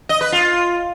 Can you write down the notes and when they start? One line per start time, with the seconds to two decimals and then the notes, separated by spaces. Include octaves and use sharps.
0.09 D#5
0.21 B4
0.32 F4